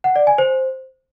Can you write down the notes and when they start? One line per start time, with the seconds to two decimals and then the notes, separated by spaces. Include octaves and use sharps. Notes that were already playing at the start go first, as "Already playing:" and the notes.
0.04 F#5
0.16 D5
0.27 G#5
0.38 C5